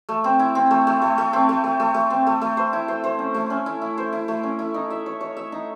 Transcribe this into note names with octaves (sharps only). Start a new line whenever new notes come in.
A3
C4
E4
C4
A3
A3
A3
A3
C4
A3
A3
A3
A3
C4
A3
A3
C5
E4
C5
C5
C#4
A3
C#4
E4
E4
C5
E4
A3
C#4
E4
D#4
E5
C#5
C#5
E5
D#4